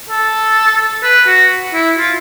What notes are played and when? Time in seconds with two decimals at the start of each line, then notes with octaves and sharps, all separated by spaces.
0.09 A4
1.03 B4
1.27 F#4
1.74 E4
1.98 F4